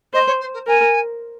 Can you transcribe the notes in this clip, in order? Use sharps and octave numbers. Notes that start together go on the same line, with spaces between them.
C5 D#5
C#5
C5
A#4
A#4 G#5